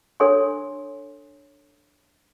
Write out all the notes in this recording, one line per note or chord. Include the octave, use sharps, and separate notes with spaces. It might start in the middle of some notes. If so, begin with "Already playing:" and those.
D4 A4 C#5 G#5 C6